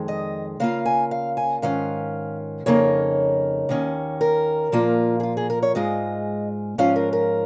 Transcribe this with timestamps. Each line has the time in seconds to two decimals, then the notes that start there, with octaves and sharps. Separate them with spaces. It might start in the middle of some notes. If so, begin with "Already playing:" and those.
Already playing: F2 D#3 G#3
0.08 D#5
0.60 C#3 A#3 F4 F5
0.86 G#5
1.11 F5
1.37 G#5
1.62 G#2 D#3 C#4 F4 F5
2.66 F2 C#3 A#3 D#4 C#5
3.69 D#2 D#3 C#4
4.21 A#4
4.72 A#2 F3 A#3 F4
5.20 G#4
5.23 F4
5.37 G#4
5.50 A#4
5.62 C#5
5.75 G#2 G#3 F4 D#5
6.78 G#2 F3 C#4 F4 F5
6.96 A#4
7.13 A#4